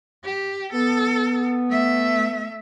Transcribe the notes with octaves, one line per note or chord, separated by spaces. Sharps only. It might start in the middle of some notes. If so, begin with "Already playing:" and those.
G4
B3 A4
A3 E5